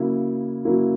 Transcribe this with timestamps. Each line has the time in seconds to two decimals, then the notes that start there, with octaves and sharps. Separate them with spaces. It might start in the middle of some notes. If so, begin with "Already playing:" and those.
Already playing: C#3 F#3 A#3 E4
0.65 C#3 F#3 A#3 E4